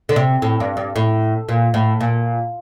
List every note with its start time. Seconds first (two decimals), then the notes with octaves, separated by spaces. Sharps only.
0.09 D3
0.16 C3
0.42 A2
0.60 G2
0.77 G2
0.96 A2
1.49 A#2
1.74 A2
2.01 A#2